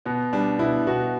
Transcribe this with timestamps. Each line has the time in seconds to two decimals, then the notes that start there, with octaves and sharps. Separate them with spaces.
0.06 B2 B3
0.33 G3 D4
0.59 B2 E4
0.87 B2 F#4